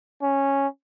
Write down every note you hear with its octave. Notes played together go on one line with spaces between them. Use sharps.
C#4